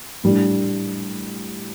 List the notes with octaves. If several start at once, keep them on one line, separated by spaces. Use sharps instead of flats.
A2 G3 D4